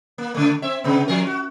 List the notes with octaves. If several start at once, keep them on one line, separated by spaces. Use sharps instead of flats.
A#3
C#3 A3
C4 E5
C3 B3
F3 A#4
F#4